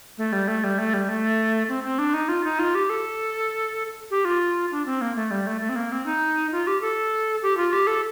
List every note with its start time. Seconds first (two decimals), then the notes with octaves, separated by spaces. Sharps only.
0.18 A3
0.33 G3
0.48 A3
0.64 G3
0.78 A3
0.94 G3
1.09 A3
1.69 C4
1.83 C4
1.99 D4
2.14 D#4
2.29 F4
2.44 D#4
2.59 F4
2.75 G4
2.90 A4
4.11 G4
4.25 F4
4.71 D4
4.86 C4
5.01 A#3
5.16 A3
5.31 G3
5.47 A3
5.61 A3
5.69 C4
5.76 A#3
5.92 C4
6.06 D#4
6.52 F4
6.67 G4
6.81 A4
7.42 G4
7.57 F4
7.73 G4
7.87 A4